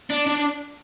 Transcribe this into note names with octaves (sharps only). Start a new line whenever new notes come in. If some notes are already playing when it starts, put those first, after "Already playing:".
D4
D4